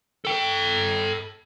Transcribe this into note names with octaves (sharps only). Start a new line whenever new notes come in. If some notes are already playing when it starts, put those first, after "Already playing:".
A4 G5